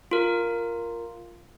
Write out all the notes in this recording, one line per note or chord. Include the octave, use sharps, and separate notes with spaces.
F4 A#4